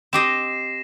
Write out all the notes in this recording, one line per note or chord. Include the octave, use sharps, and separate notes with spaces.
C4 G4 D#5 A#6 C7 E7